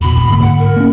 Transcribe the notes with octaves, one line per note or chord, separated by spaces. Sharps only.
E2 B2 B5
E1 C#2
G#2 D3 A#3
F#5
A#4
A#3 C#4